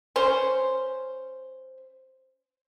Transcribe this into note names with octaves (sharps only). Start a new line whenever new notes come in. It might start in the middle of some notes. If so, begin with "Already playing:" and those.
C#4 C5